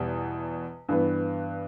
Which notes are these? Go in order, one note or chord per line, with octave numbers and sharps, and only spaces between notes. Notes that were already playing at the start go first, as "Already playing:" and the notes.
Already playing: E2 B2 G3
G2 E3 B3